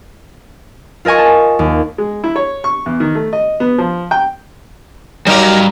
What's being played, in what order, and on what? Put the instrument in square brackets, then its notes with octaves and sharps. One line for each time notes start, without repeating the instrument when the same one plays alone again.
[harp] F4 A#4 D#5 G#5 C#6
A5
D#2
[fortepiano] G#3
E4
C#5
C#6
E2
D#3
A3
D#5
B3
F3
G5
[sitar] F#3 D#4 A#4 [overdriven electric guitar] G3 F5